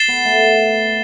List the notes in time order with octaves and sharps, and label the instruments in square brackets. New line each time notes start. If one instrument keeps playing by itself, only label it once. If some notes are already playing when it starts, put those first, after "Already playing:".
Already playing: [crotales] A6 C7 E7 G7
[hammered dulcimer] B3
A3